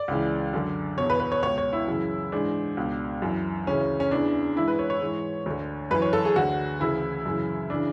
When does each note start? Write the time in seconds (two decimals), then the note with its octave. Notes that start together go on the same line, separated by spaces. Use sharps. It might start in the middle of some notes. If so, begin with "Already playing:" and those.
Already playing: D5
0.08 C#2 C#3 E3
0.53 F#2 D3
0.98 E2 B2 C#5
1.10 B4
1.20 B4
1.32 C#5
1.42 C#2 B2 C#5
1.58 C#5
1.73 E4
1.87 F#2 C#3 E3
2.32 G#2 E3 D4
2.77 C#2 B2
3.22 F#2 E3
3.67 D2 C#3 E3 C#4
4.00 C#4
4.11 E2 C#3 E3 D4
4.56 G#2 E3 E4
4.68 B4
4.79 C#5
4.90 C#5
5.01 G#2 E3
5.46 D2 D3
5.91 F#2 B4
5.94 E3
6.02 C#5
6.13 A4
6.25 G#4
6.36 D2 D3 F#4
6.80 D2 C#3 E3 E4
7.25 F#2 C#3 E3
7.70 C#3 E3 D4